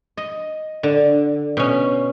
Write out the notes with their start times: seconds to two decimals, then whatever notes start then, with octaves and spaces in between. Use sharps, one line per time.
0.17 D#5
0.83 D3
1.57 B2 C#4